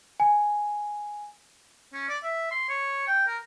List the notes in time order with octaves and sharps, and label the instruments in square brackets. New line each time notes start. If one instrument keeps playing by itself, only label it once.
[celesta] G#5
[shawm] C#4
D5
E5
C6
C#5
G5
A#4